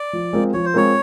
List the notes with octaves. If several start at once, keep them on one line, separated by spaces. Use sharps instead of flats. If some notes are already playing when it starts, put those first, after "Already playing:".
Already playing: D5
F3
G#3 C4 F4 A#4
F3 C#5
C5
G#3 C4 F4 A#4 C#5